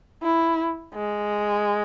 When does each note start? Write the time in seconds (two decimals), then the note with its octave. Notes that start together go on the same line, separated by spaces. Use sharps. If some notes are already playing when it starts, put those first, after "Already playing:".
0.22 E4
0.94 G#3